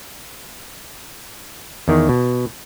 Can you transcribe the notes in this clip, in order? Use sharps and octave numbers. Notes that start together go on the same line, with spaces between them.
E2 D#3
B2